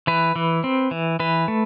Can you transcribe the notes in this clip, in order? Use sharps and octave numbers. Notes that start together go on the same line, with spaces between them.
E3 B4
E3
C4
E3
E3 B4
A3